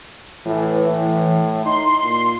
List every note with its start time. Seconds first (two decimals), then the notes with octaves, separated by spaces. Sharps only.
0.45 A2 E3
0.86 A2
1.65 D#4 C6
2.03 A#2